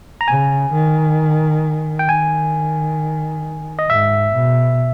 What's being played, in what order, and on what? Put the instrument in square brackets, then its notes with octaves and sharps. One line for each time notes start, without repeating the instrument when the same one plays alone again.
[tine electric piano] A#5
[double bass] C#3 [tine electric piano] G#5
[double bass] D#3
[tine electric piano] G5
[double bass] D#3 [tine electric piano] G#5
[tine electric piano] D#5
[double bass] G#2 [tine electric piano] E5
[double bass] B2